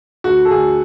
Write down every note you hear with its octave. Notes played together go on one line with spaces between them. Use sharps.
D2 F#4
A4
D2 G#4